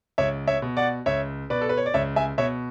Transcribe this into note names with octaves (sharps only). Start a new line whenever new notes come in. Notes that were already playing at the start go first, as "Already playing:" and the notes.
C#2 C#5 E5
C#5 E5
B2
D5 F#5
C#2 C#5 E5
B2 B4 D5
A4
B4
C#5
D5
C#2 C#5 E5
E5 G#5
B2 C#5 E5